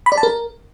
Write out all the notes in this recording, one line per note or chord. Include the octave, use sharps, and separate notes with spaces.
B5
D5
A5
A#4